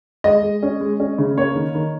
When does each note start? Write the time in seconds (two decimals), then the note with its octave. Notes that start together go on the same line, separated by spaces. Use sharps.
0.24 G#3 D#5
0.43 G#3
0.63 C#4
0.80 G#3
1.00 C#4
1.18 C#3
1.37 A#3 C#5
1.55 D#3
1.75 D#3